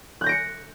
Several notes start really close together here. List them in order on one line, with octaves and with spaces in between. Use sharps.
F#6 G6 A#6 D7 C#7